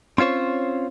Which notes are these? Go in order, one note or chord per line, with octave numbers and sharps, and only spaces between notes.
C4 C#4 F4 C5 C#5